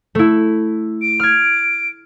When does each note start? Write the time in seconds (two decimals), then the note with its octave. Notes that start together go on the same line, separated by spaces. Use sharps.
0.15 A3 E4
1.02 D7
1.20 F6 G#6